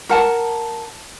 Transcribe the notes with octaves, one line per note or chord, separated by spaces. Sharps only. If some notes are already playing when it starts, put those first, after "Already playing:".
A#4 F#5 A5